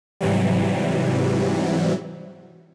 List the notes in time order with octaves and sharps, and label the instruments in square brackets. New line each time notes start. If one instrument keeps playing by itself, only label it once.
[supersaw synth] G#2 C3 E3 F#3 G3